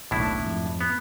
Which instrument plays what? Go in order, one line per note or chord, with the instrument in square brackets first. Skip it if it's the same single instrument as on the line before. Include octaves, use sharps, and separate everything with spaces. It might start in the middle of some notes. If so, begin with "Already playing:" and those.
[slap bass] D#1 B1 D#3 [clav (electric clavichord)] A2 D4 E4
[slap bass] F2 G#2
[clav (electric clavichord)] B3